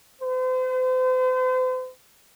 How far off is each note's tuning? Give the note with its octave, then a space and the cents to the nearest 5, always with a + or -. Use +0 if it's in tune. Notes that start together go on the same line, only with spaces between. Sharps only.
C5 -40